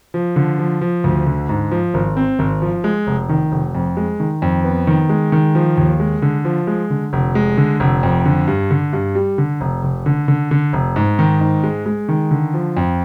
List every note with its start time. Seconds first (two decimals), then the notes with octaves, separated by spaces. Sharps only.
0.14 F3
0.36 D3
0.59 F3
0.81 F3
1.04 D2
1.27 D3
1.49 G#2
1.71 F3
1.94 G#1
2.17 C4
2.39 G#1
2.62 F3
2.84 G#3
3.07 F1
3.29 D#3
3.52 F1
3.75 F2
3.97 G#3
4.20 D#3
4.42 F2
4.64 B3
4.87 D#3
5.09 G#3
5.32 D#3
5.55 F3
5.77 D#2
6.00 G#3
6.22 D3
6.45 F3
6.67 G#3
6.90 D3
7.13 F1
7.35 G#3
7.57 D3
7.80 F1
8.03 F2
8.26 D3
8.47 G2
8.71 D3
8.93 G2
9.15 G3
9.38 D3
9.61 F1
9.83 F1
10.06 D3
10.28 D3
10.51 D3
10.73 F1
10.96 G#2
11.19 D#3
11.41 G#2
11.64 G#3
11.86 G#3
12.09 D#3
12.31 D3
12.54 F3
12.77 F2